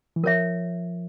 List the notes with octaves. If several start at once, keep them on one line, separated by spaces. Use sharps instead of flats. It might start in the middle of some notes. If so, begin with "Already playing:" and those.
E3
F3 A#4 C#5 E5